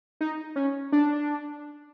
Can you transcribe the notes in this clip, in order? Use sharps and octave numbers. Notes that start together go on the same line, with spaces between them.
D#4
C#4
D4